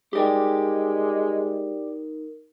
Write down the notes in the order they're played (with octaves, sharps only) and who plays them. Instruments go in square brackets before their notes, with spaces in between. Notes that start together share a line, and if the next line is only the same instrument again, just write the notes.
[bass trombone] G#3 [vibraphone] D#4 A#4 [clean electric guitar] G4 D5 G5